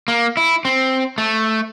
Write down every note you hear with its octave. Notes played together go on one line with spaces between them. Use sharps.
A#3
E4
C4
A3